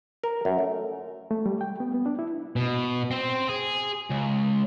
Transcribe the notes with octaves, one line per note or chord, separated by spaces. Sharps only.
A#4
F#2
A3
A3
G3
G5
B3
B3
D4
E4
B2
C4 C5
G#4
C#2